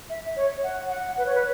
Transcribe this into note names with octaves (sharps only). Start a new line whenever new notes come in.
E5
C#5
F#5
F#5
B4
C#5
B4